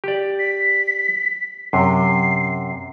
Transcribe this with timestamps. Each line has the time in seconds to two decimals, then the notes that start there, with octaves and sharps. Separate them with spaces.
0.04 G4 D5
0.39 B6
1.73 F#2 C3 C7